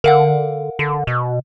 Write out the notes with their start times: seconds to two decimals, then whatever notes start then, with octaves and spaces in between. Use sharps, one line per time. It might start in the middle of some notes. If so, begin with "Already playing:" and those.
0.04 D3 A#4 F5 F#5
0.79 D3
1.07 B2